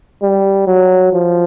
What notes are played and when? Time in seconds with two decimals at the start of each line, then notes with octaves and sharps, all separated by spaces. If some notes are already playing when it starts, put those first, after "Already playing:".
0.22 G3
0.67 F#3
1.13 F3